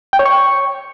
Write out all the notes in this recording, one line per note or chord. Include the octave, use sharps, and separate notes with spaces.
G5
C#5
C#6